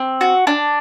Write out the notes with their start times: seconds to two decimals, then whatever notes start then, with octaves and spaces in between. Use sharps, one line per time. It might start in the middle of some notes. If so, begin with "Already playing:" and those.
Already playing: C4
0.21 F#4
0.47 D4